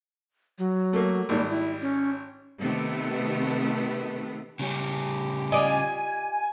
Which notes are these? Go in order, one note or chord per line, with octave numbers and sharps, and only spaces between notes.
F#3
A3 A#3
G#1 D#3 G3 A#3
E4
C#4
C3 D#3 A3 B3
C#3 G3 C#4 G4
F4 D5 D#5 G#5